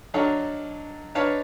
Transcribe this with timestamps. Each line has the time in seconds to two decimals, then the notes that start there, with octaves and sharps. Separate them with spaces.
0.14 F#3 D4 D#4 A4 C#5 F5
1.15 D4 D#4 B4 C#5 F5 A5